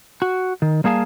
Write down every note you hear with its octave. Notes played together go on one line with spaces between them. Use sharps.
F#4
D#3
G3 A#3 G#4 F5 A5